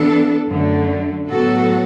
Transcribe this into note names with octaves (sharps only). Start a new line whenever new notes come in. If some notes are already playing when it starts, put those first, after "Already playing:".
Already playing: E3 B3 D4 A4
F#2 D3 A3
A2 F#3 B3 F#4 A4